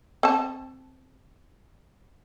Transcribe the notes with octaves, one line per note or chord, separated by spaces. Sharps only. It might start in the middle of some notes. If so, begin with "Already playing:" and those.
C4 A5